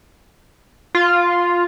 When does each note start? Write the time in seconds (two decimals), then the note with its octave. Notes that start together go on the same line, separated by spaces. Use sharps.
0.95 F4